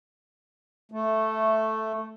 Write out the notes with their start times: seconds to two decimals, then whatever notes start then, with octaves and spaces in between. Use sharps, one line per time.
0.92 A3